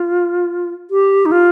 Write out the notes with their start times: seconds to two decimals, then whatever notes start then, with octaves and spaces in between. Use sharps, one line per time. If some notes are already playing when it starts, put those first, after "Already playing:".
Already playing: F4
0.91 G4
1.26 D#4
1.32 F4